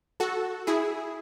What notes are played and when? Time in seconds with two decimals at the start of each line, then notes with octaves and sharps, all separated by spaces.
0.20 F#4 A4
0.67 E4 G#4